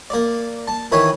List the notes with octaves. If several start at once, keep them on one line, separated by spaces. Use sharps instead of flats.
A#3 D5
A5
D#3 E3 B4 C#5